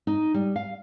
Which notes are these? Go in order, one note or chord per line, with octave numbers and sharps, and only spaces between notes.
D#4
G3
F5